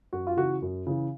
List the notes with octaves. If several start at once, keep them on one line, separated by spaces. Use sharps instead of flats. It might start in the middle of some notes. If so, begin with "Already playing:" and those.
F#2 F#4
F4
C#3 E3 F#4
F#2
C#3 E3